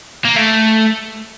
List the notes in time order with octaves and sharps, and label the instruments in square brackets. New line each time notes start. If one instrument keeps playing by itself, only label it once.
[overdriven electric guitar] A#3
A3